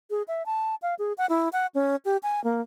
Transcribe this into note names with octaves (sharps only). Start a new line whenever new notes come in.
G#4
E5
A5
F5
G#4
F#5
E4
F#5
C#4
G4
G#5
A#3